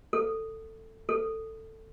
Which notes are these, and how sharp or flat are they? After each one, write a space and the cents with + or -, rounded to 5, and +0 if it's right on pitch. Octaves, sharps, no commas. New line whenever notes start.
A4 +15
A4 +15